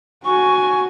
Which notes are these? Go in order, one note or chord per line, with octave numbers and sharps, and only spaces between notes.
F#4 G#5 C#6